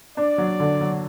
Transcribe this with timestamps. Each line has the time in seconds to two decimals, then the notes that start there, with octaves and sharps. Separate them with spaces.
0.17 D4 D5
0.38 F#3
0.60 D3
0.81 F#3